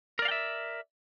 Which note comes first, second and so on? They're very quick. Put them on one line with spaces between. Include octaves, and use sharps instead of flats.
A#4 D5 F5 G5 E5